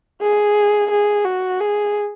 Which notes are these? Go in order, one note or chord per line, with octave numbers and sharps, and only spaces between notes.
G#4
G#4
F#4
G#4